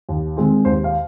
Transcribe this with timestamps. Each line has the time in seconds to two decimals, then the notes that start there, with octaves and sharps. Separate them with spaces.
0.09 D#2
0.37 D#3 G#3 C4
0.65 D#2 C5
0.84 F5